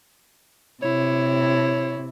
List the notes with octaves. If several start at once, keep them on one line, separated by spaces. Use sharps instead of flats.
C3 E4 C#5